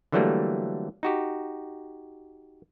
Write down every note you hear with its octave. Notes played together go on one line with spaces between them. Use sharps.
D3 E3 F#3 G3 A3 A#3
D#4 F#4 G4